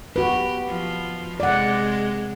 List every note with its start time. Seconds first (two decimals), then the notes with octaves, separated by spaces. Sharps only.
0.16 F#4 G4 B4
0.68 F3
1.40 C3 G#3 D5 F#5